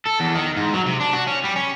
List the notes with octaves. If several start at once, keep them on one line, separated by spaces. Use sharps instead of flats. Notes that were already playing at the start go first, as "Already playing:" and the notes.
A4
E2
D#3
G#2
F#3
C3
D4
F#4
C#4
G3
C#4